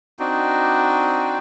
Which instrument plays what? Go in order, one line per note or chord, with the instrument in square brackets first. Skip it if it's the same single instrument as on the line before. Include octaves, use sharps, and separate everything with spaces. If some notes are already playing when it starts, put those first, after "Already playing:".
[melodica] C4 D4 D#4 F#4